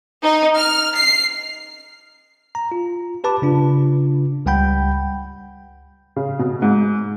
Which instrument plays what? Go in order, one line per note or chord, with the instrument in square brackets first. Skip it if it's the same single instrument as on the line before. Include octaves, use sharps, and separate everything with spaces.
[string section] D#4
F6
C7
[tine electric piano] A#5
F4
G4 B4 A5 B5 D6
C#3 D4 F4
C#2 G3 F#5 G5 B5 G6
[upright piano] C#3
B2
G#2